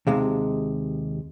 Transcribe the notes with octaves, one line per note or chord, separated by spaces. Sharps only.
D#2 C3 G#3